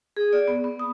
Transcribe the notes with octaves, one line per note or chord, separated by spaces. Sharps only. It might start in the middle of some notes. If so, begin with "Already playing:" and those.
G#4
D5
B3
B3
D#6